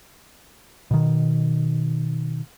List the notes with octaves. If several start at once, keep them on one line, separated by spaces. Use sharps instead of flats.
B2 D#3